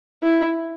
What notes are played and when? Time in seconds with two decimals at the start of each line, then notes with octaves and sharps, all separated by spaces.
0.23 E4